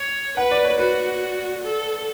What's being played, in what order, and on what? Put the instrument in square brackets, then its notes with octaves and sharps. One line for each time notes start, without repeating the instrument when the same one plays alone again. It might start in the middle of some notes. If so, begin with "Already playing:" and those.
Already playing: [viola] C#5
[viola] B4 [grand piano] F#5
[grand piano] D5
C#5
[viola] F#4 [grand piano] B4
[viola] A4